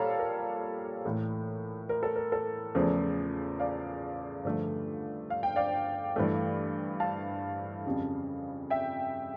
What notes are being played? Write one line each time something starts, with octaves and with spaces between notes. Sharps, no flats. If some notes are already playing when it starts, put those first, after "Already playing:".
Already playing: A#2 G3 A4 C#5 F5 A5 A#5
A#4
A2 E3 A3
A#4
A4
A#4
A4
E2 C#3 F3 A3
D5 F5
G2 D3 F3 A3
F5
G5
D5 F5
G2 E3 A3
F5 A5
F2 C#3 G3
E5 G5